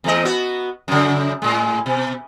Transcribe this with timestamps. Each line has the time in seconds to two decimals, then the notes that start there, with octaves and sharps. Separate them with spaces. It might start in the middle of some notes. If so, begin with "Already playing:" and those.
0.04 E2 A3 D#5
0.25 B3 F#4
0.88 F#2 C#3
1.42 A2 G#3
1.86 B2